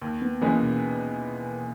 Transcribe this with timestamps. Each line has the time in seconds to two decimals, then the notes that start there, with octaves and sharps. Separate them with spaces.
0.01 D#2
0.22 B3
0.41 C#3 E3 G#3 A#3 B3
0.62 B2